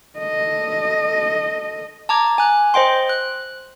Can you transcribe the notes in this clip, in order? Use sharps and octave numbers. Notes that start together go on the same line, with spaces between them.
A4 D#5
A5 A#5 D6 G#6
G#5 F#6
C5 D#5 G5 C6
F#6